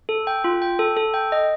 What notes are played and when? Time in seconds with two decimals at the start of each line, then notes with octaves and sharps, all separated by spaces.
0.09 A4
0.27 G5
0.44 F4
0.62 G5
0.79 A4
0.97 A4
1.14 G5
1.32 D#5